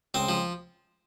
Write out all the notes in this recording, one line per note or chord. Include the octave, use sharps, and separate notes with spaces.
C#2 C4
F3